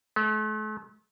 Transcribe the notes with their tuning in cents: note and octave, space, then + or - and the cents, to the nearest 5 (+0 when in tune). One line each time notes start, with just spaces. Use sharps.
A3 -40